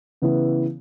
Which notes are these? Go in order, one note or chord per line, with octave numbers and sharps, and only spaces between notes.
C#3 E3 B3 E4